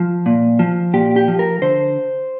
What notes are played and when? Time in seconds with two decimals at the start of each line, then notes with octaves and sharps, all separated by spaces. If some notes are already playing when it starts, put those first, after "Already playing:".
Already playing: F3
0.26 A#2
0.59 F3
0.94 A#2 G4
1.16 G4
1.28 F3
1.39 A#4
1.62 D3 C5